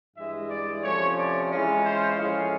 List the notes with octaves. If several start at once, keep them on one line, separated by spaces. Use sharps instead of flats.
G2 E3 G#3 E5
D5
C3 F3 A3 C#4 C#5
D5
E3 G#3 C#4 F4
C5
A2 F3 G#3 C#4 F4 F5